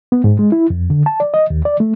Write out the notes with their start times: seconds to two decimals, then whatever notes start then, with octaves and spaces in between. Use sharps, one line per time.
0.12 B3
0.24 G#2
0.39 G#3
0.52 E4
0.70 F2
0.90 D3
1.06 A5
1.20 D5
1.34 D#5
1.50 D#2
1.65 D5
1.80 A3